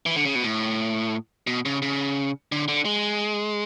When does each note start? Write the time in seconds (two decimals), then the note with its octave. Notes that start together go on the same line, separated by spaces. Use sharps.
0.06 E3
0.16 D3
0.25 C#3
0.35 B2
0.43 A2
1.47 B2
1.66 C#3
1.82 C#3
2.52 D3
2.68 D3
2.85 G#3